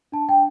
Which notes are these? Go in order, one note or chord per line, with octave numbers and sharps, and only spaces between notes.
D4 A5
G5